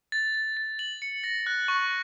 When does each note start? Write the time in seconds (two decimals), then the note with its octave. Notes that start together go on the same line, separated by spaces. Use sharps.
0.12 A6
0.35 A6
0.57 A6
0.79 F#7
1.02 C#7
1.24 A#6
1.46 F#6
1.68 C#6